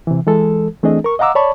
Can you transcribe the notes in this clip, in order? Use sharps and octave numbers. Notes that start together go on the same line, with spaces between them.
C3 E3
E3 G#3 A4
E3 A3 C4 D4 G#4 D#5
A#4 C#6
D#5 F5 F#5 A#5 D6 E6
C#5 D5 A5 B5 C#6